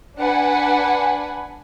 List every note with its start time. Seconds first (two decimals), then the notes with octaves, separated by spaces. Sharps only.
0.18 D4 B4 F#5 G#5